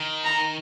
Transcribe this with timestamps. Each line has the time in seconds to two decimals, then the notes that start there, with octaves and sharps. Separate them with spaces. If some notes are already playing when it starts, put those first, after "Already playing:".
Already playing: D#3
0.24 A#5